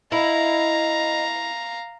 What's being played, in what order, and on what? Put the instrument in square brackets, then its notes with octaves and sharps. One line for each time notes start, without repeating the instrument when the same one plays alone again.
[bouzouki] E4 [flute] D#5 [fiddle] F5 A#5